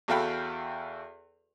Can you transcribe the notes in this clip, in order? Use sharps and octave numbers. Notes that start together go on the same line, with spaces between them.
E2 F#4 A4 F5 G5 B5